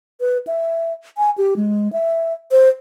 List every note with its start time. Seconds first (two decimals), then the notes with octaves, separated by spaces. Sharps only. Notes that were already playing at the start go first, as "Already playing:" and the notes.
0.21 B4
0.47 E5
1.17 G#5
1.38 G4
1.56 G#3
1.93 E5
2.51 C5